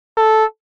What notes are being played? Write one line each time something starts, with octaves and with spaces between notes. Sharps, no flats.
A4